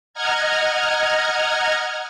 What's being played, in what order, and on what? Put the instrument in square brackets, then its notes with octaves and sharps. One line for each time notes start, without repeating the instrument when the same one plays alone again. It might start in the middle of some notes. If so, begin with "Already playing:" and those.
[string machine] D#5 F#5 A#5 F6 G#6